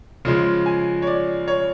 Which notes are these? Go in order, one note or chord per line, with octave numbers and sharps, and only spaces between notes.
C#3 F3 G#3
G#5
C#5
D5
C#5